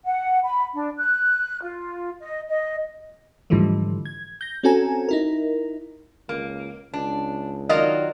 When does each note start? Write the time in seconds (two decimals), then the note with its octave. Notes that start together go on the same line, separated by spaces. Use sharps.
0.06 F#5
0.43 B5
0.74 D4
0.98 F#6
1.62 F4
2.20 D#5
2.48 D#5
3.50 G#2 D3 E3 F3 G3 A3
4.05 G#6
4.41 G6 A#6
4.63 C4 C#4 F#4 A4 G#5 A#5
5.09 D#4 E4 A#4
6.29 C#2 A#3
6.94 C#2 D4
7.69 D#3 F#3 F4 A#4 D5 D#5